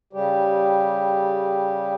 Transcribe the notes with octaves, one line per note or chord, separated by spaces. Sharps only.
C#3 G3 G4